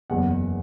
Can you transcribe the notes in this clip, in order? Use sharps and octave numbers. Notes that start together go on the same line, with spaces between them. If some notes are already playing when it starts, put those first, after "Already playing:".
F#1 E2 C#3 F#5